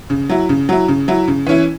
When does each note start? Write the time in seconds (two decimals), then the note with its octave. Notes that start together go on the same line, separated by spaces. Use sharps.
0.10 C#3
0.29 F#3 E4
0.49 C#3
0.69 F#3 E4
0.88 C#3
1.08 F#3 E4
1.28 C#3
1.46 E3 C#4 E4